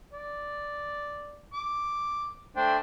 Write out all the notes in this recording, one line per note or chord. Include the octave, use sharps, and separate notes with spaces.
D5
D6
A3 D4 C5 G5